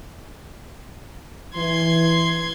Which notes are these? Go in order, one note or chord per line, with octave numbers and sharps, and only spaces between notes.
E3 C6 G#6